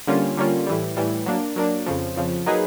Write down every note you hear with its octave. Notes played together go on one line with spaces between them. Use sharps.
D3 G3 A#3 C#4 F4
D3 G3 A#3 C#4 F4
A2 E3 G3
A2 E3 G3
F#3 A#3 D4
F#3 A#3 D4
F2 C#3 F3
F2 C#3 F3
F#3 A#3 D#4 G#4 B4